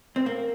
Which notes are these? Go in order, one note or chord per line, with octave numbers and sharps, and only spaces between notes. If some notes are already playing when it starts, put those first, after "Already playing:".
C4
A#3